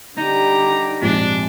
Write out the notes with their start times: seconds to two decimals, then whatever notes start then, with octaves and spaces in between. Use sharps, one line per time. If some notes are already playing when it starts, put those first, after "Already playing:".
0.18 D3 G3 D#4 G4 A#5
1.02 A#1 F2 G#2 D4